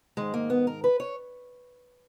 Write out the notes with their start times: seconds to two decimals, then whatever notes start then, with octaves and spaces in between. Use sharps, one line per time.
0.17 G#2 D#3 G#3
0.34 A#3
0.50 B3
0.67 A#4
0.84 B4
1.00 C#5